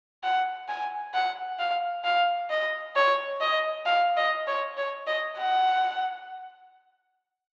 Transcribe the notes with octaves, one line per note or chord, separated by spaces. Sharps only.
F#5
G#5
F#5
F5
F5
D#5
C#5
D#5
F5
D#5
C#5
C#5
D#5
F#5